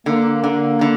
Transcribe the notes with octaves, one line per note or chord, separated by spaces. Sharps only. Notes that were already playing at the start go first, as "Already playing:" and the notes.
D3 A#3
D3
D3